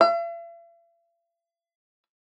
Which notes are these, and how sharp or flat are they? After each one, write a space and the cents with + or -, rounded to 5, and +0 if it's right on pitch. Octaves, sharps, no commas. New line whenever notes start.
E5 +45